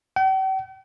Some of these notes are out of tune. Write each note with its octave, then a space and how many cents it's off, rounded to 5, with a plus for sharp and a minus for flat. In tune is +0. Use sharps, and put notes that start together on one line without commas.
G5 -45